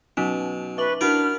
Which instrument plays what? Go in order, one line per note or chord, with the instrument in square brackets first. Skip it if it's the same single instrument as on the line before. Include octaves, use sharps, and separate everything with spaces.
[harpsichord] B2 [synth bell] F#3 C#4 D#4
[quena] B4 [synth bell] E5 D6 F#7 [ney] C#6
[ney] D4 [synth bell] E4 F#4 F#5 [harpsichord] A#4 [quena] F6